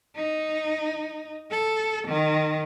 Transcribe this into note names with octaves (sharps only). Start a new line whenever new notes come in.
D#4
A4
D#3